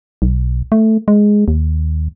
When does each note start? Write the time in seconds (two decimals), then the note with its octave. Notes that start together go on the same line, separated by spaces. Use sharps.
0.22 B1
0.72 A3
1.08 G#3
1.48 D#2